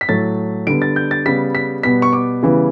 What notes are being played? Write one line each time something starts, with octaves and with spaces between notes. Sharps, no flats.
B6
A2 F#3 A3 A6
D3 G3 B3 D7
A6
G6
A6
C#3 G3 B3 B6
B6
B2 G3 B3 B6
C#6
D6
C#3 E3 G3 B3